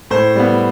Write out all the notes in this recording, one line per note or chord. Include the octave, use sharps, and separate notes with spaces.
A2 C5
G3 B3